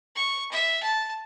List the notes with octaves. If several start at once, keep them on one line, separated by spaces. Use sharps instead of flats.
C#6
E5
A5